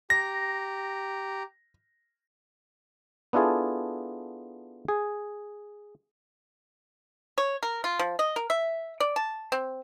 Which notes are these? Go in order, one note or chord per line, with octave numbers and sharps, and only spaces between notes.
G4 A#5 A#6
B3 D4 E4 F4 G#4 A4
G#4
C#5
A#4
F4
F3
D#5
A#4
E5
D5
A5
C4